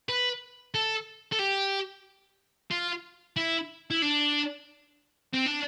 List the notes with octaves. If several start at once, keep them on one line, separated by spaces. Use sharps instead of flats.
B4
A4
A4
G4
F4
E4
E4
D4
C4
D4